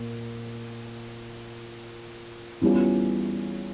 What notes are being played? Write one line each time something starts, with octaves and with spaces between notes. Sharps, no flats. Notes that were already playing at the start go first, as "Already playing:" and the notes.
Already playing: A#2
E2 E3 G3 C#4 F4